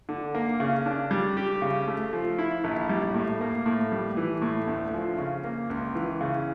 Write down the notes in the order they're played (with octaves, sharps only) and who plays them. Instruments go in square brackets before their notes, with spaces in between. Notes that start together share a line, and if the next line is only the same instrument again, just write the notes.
[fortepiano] D3
A#3
C#3
D4
G3
G4
C#3
A3
F3
E4
A#1
G3
A2
A#3
A2
G3
E3
A2
D2
F3
C#3
A#3
C#2
E3
C#3